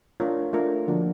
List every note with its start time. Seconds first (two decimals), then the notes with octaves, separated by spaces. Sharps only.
0.20 A3 D4 F4 A#4 C#5
0.53 A3 D4 F4 A#4 C#5
0.87 D3 F3 A#3 D4 F#4